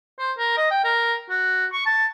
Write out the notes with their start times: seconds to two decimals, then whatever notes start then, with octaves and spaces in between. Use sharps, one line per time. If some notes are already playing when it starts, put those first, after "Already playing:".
0.19 C5
0.38 A#4
0.57 D#5
0.71 G5
0.84 A#4
1.30 F#4
1.73 C#6
1.86 A5